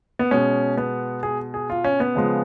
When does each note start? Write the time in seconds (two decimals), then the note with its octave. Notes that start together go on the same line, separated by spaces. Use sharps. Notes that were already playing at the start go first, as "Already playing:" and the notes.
0.19 B3
0.31 B2 G#3 C#4
0.77 B3
1.23 G#4
1.54 G#4
1.70 F4
1.84 C#4
2.00 B3
2.15 C#3 F3 G#3